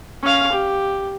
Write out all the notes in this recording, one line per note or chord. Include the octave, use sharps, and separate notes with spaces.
C#4 F5
G4